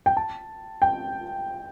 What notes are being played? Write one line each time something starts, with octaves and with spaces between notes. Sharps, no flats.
G5
A5
G5